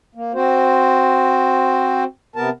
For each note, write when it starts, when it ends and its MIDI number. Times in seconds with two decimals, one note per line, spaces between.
0.15 0.32 58
0.34 2.04 60
0.34 2.04 66
0.34 2.04 72
2.36 2.50 48
2.36 2.50 59
2.36 2.50 70
2.36 2.50 81